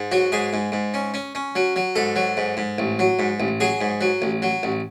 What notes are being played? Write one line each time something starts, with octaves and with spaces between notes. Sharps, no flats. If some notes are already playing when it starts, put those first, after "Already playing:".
Already playing: G#2
F#3 F#4
G#2 G#4
G#2
G#2
C#4
C#4
C#4
F#3
F#3
G#2 A4
F#3
G#2
G#2
A1
F#3
G#2
A1
F#3 G#4
G#2
F#3
A1
F#3
A1